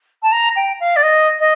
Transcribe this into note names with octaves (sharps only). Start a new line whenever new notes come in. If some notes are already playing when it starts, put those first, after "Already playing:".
A5
A#5
G5
F5
D5
D#5
D#5